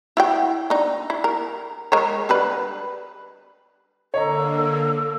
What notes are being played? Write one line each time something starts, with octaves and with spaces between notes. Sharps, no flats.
E4 F#4 G5
D4 D#4
E4
A#4
G#3 A#4 C#5
D3 G3 B4
D3 A#3 A4 C#5 D#5 A#5